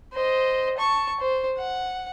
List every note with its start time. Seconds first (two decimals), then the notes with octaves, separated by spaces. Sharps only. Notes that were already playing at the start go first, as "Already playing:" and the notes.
0.14 C5 D#5
0.78 A5 C#6
1.20 C5
1.58 F#5